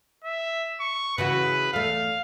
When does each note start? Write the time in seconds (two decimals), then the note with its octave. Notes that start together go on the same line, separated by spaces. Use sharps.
0.24 E5
0.80 C#6
1.18 C#3 E3 F#4 B4
1.73 E2 A3 F5